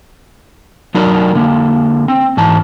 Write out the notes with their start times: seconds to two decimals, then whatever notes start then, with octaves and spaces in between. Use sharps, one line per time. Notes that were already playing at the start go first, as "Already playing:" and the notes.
0.95 F#3 D4 D#4 F#4 A#4
1.35 D3 A#3
2.08 C4
2.37 G#2 E3 A5